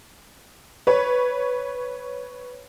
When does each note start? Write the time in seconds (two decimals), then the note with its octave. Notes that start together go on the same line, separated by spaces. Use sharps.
0.87 B4 C#5